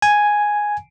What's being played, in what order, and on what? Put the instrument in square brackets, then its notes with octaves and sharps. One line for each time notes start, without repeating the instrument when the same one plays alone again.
[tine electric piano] G#5